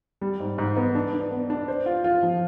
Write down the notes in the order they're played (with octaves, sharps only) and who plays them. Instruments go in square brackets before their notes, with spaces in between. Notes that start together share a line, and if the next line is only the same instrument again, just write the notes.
[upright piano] G3
G#2
G#2
B3
D4
D4
B3
D4
C5
F4
F4
F3